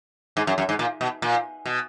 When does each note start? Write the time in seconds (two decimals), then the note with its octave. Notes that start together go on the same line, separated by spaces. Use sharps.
0.37 G#2
0.47 F#2
0.58 F#2
0.69 G#2
0.79 A#2
1.01 B2
1.22 A#2
1.66 B2